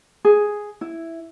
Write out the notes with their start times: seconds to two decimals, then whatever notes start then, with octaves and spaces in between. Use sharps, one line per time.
0.25 G#4
0.81 E4